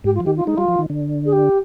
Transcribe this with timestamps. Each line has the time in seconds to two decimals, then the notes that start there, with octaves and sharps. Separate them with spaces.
0.04 G#2 G4
0.15 F4
0.20 F3
0.25 D#3 G4
0.36 F4
0.46 G#3 D#4
0.57 G3 F4
0.68 F3
0.79 D#3
0.90 D3
1.25 G#4
1.32 G4